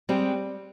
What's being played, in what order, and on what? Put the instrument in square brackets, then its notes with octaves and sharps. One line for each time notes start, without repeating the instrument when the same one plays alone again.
[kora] G3 [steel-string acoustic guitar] G#3 C4